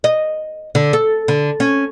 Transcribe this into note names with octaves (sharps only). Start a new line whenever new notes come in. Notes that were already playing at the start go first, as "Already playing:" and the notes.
D#5
D3
A4
D3
C#4